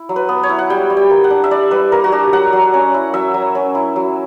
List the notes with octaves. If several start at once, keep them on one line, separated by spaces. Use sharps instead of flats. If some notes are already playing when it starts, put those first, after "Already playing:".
Already playing: E4
F#3
B4
B3
C#5
E4
F#5
G3 G5
G3
G5
A#3
F#5
D4
E5
G3 D5
G3 B4
A#3 A#4
F#4
D4 G4
F#3 F#5
F#3
C#4
E4
F#3 E5
F#3
C#4
E4
F#3